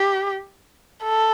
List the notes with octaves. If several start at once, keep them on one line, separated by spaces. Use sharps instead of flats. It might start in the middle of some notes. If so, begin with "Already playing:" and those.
Already playing: G4
A4